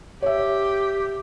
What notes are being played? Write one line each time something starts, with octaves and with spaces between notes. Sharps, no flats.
G4 C#5 E5